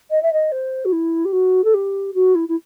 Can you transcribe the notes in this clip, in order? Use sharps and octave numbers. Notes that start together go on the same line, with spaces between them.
D#5
E5
D#5
C5
F#4
E4
G4
F#4
A4
G4
F#4
E4
E4